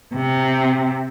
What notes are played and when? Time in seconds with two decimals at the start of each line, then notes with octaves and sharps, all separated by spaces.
0.15 C3